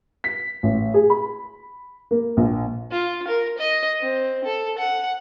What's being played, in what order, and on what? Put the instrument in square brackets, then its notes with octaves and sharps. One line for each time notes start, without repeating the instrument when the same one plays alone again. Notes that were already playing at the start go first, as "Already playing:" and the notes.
[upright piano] B6
A1
G#4
B5
A#3
A#1
[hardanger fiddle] F4
A#4
D#5
C4
A4
F#5